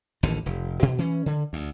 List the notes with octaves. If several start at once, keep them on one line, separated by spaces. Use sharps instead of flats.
A1 D#2 D3
F1
B2
E3 C#4
D3
D2